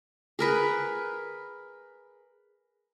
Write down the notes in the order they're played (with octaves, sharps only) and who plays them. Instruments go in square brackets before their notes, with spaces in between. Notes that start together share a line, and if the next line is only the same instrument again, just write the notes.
[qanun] G#4 A#4 B4